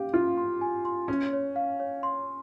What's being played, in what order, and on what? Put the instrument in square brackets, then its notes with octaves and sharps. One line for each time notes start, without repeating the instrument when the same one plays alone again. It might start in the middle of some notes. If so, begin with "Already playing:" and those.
Already playing: [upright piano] G4 [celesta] F5
[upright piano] F4 [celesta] C6
[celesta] C6
G#5
C6
[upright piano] C#4 [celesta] C#5
[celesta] C#5
F5
C#5
C6